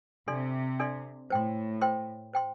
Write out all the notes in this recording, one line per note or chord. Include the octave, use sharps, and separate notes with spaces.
C3 D4 A4 D5 C6
D4 A4 D5 C6
A2 C5 G5 C6
C5 G5 C6
C5 G5 C6